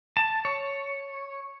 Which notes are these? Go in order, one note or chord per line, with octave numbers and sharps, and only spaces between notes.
A5
C#5